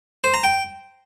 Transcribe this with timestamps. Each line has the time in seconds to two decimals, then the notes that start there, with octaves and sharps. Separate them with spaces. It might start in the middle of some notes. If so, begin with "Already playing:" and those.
0.24 C5
0.34 A#5
0.44 G5